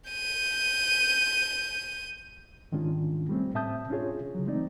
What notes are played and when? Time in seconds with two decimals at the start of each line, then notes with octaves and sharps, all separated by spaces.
0.10 G6 D#7
2.72 G#2 D#3 G#3 C#4 D4 F4
3.29 G3 A3 C4 C#4
3.54 A2 C4 E5 A5 D#6 G6
3.90 C#4 D4 F4 G#4 C#5
4.34 C#3 F#3
4.46 E3 G#3 A3 C4 D#4 D5